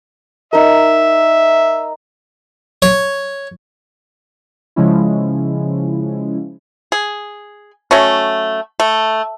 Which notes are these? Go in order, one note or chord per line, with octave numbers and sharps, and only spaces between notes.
D#4 A#4 E5
C#5
C#3 F3 G#3 C#4 E4
G#4
F#3 A3 C#4
A3